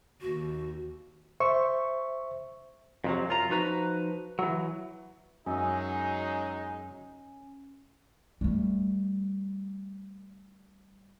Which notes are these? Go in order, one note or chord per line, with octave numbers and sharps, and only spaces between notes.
D#2 F#4
C5 E5 C#6
F2 C3 F#3
F#2 F4 A#5
F3 D#4 F#4 B4 A#5
E3 F#3
F#2 F#3 G#3 C#4 D#4
G3 A3